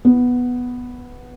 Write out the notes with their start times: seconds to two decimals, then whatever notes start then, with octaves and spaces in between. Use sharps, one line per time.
0.05 B3